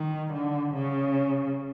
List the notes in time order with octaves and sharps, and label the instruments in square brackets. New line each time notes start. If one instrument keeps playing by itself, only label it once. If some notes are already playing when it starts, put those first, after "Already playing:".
Already playing: [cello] D#3
D3
C#3